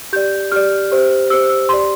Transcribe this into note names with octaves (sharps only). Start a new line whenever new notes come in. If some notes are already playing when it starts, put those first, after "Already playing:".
G4 D5 G6
G4 D5 F6
G4 C5
G4 C5 E6
E6
G4 D5 C6